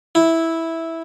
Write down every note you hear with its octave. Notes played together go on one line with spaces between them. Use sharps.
E4